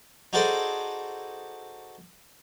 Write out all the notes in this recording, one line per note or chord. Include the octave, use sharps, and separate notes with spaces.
D#4 F#4 G#4 A4 C5 D5